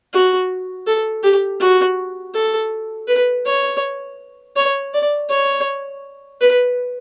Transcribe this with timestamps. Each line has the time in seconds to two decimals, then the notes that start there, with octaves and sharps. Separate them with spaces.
0.13 F#4
0.87 A4
1.23 G4
1.60 F#4
2.34 A4
3.08 B4
3.46 C#5
4.56 C#5
4.94 D5
5.30 C#5
6.40 B4